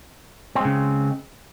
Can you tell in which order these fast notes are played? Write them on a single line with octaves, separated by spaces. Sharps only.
C4 G#3 C#3